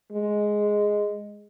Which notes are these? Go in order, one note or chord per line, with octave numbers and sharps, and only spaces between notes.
G#3